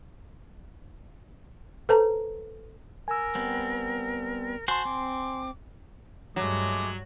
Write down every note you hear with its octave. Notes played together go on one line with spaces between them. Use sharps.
A4 B4 C5 A5 A#5
A#4 G#5 E6
G3 B3 C4
F#4 C5 G#5 A5 C6
C4 D6
G2 F#3 G#3 A3 D6